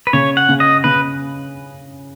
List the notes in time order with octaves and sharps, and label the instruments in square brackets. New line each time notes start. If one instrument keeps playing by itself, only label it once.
[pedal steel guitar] B4
[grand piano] C#3 [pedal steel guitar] C#5
[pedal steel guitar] F#5
[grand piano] C#3
[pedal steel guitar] D#5
[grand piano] C#3 [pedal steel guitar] B4